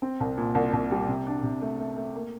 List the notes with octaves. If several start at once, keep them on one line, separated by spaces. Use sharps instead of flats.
C4
C2
A#2
C2
C2
G3
C3
D4
C3
A3
A3
A3
A#3